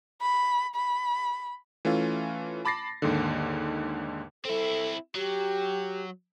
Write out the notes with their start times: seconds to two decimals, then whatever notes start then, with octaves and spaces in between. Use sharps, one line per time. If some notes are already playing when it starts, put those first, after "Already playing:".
0.22 B5
0.75 B5
1.85 E3 A3 C#4 F4
2.65 A5 B5 D6 A6 A#6 C7
3.02 D#2 G#2 D3
4.45 C4 E4 A4
5.15 F#3 G4